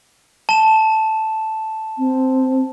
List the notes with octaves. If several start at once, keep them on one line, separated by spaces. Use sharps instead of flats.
A5 E7
C4